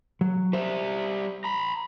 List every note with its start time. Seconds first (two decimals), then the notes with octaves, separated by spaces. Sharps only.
0.21 F#3
0.53 G3 C5 E5
1.44 A#5 B5